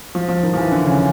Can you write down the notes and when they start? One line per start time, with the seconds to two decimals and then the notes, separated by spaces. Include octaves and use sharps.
0.15 F3
0.28 F3
0.43 D#3
0.53 F3
0.57 E3
0.72 D3
0.86 C#3